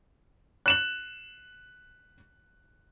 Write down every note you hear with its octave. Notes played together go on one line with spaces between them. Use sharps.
F#6 E7 F#7